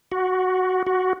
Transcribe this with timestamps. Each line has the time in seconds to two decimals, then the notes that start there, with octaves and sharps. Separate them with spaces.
0.12 F#4
0.87 F#4